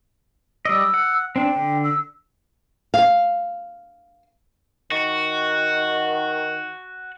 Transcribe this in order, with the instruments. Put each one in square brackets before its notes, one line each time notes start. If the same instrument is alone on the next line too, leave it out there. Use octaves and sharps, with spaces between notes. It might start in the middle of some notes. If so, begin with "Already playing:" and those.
[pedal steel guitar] G3 D5 D#5 [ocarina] E6
[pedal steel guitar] F#5
[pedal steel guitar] C4 D4 [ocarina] G5
[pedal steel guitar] D3
[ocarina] E6
[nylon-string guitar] F5
[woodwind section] D#3 [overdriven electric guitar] F#4